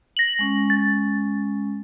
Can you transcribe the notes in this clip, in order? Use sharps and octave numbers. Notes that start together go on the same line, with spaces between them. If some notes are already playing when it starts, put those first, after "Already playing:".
A#6 F#7
G#3 C#4
A6